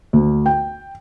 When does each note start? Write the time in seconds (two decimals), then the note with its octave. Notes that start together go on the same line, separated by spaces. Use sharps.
0.13 D2
0.46 G5